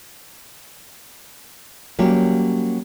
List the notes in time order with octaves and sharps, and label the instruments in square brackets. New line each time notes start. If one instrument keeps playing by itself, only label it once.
[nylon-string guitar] F#3 G3 A#3 C#4 G4